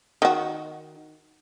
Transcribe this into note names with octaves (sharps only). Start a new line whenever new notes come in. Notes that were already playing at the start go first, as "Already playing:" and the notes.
D#3 F#4